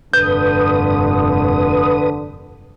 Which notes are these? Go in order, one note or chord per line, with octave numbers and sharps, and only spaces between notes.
F1 G2 D3 B4 D#6 G6